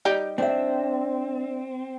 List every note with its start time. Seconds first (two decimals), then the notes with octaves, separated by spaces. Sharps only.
0.05 G3 D#4 G4
0.38 C4 D4 E5